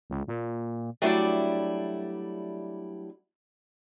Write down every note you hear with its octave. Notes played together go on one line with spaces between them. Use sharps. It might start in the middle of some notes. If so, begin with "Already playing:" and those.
C#2
A#2
F#3 G3 A3 D4 E4 D5